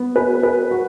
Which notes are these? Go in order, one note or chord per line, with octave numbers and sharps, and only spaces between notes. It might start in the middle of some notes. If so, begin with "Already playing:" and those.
Already playing: B3
B4
B4
F#4